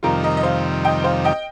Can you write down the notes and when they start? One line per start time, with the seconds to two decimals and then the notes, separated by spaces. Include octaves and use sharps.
0.03 F2 C3 D#3 G3 F4 A#4
0.23 A#4 D#5
0.37 D#5
0.43 C5 F5
0.85 D#5 G5
1.04 C5 F5
1.24 D#5 G5